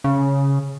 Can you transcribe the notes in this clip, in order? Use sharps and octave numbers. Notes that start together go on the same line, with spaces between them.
C#3